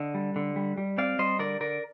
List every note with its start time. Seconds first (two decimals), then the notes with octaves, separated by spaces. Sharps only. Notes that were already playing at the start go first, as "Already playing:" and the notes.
Already playing: D3 D#5
0.14 G3
0.36 D3
0.56 G3
0.78 G3
0.98 C4 D5 F5
1.19 G3 C5 D#5
1.39 D3 A#4 D5
1.60 D3 A#4 D5